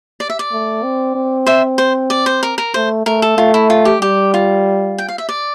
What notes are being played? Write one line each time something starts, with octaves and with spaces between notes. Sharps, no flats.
D5
E5
D5
A3
C4
C4
C5 E5
C5
D5
C5
A#4
A#4
A3 C5
A3 A#4
A4
A3 F4
E4
F4
G4
G3 G4
F4
G5
F5
E5
D5